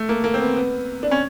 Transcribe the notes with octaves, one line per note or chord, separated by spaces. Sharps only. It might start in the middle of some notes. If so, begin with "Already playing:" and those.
Already playing: A3
A#3
A#3
C4
B3
B3
D4
C#4